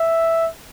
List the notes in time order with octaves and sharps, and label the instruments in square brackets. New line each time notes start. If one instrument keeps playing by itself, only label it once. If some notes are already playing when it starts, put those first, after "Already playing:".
Already playing: [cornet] E5